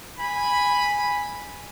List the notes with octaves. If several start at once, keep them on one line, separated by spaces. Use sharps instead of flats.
G#5 B5